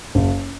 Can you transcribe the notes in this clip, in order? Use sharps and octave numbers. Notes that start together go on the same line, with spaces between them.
F#1